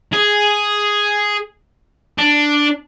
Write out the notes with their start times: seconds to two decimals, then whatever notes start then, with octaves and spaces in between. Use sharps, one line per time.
0.13 G#4
2.18 D4